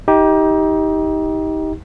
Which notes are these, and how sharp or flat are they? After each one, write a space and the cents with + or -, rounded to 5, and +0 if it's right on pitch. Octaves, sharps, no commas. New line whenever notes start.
D#4 +25 G4 +0